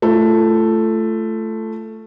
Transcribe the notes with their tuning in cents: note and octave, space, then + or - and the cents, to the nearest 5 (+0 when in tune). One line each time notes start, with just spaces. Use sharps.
A3 +0 F4 -25